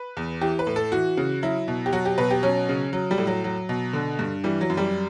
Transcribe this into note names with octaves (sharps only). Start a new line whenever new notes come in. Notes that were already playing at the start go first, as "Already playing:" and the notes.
Already playing: B4
E2
E3 G4
B4
A2
A4
E3 F#4
C#3
F#3 E4
B2
G4
F#3 F#4
G4
B2 B4
G4
F#3 C#4
C#3
F#3
G3
A2
F#3
F#3
B2
D3
G2
E3 G3
F#3
F#2
G3